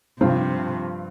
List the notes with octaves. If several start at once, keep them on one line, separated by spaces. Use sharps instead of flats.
G2 C3 F3 C4 F4